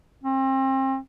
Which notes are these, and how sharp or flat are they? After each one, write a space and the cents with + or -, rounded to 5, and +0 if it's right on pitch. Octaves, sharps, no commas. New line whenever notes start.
C4 +35